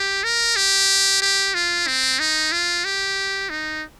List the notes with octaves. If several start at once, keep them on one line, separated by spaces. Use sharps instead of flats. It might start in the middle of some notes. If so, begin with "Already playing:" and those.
Already playing: G4
A#4
G4
G4
F4
C4
D#4
F4
G4
D#4